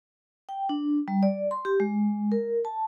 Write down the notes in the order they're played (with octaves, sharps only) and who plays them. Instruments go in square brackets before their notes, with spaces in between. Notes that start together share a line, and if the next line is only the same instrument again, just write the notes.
[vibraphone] G5
D4
G3
D5
C6
G4
G#3
A#4
A5